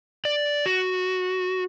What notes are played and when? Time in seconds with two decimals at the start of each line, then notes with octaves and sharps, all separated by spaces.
0.25 D5
0.66 F#4